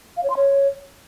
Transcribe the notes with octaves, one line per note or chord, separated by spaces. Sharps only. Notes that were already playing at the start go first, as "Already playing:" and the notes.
F5
C#5
C6
C#5